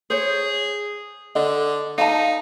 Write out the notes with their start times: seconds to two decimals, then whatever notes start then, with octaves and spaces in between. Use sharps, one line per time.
0.10 G#4 C5 C#5
1.35 D3 D#5
1.98 D#4 F5 A5 A#5